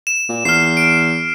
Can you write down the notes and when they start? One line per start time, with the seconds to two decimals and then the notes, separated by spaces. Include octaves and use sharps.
0.07 E7
0.29 A#2
0.45 E2 F6 C7
0.77 D7